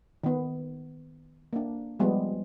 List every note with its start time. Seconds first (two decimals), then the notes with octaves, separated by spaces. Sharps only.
0.24 D#3 B3
1.53 A#3 D4
2.00 F3 G3 G#3 B3